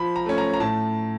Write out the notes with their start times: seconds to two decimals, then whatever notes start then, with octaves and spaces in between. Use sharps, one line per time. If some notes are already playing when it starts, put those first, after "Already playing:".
Already playing: F3 B5
0.16 A#5
0.26 A3 C#4
0.38 A#5
0.53 A#5
0.60 A2 A5